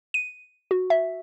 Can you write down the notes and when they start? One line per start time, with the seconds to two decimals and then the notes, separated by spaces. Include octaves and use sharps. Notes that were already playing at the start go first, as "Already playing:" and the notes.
0.14 D#7
0.71 F#4
0.90 E5